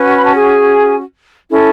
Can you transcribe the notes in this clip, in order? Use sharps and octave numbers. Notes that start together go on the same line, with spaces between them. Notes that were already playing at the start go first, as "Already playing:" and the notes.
Already playing: C#4 F#4 B4
C#6
B5
A5
G#4 G#5
C#4 E4 A4